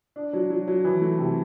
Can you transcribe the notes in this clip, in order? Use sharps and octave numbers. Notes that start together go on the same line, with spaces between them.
D4
F#3
F#3
F#3
E3
A3
C3